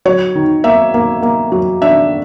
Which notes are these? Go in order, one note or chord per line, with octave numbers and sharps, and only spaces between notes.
F#3 C#5
D#3
A#3 E5
A#3
A#3
F#3
D4 E5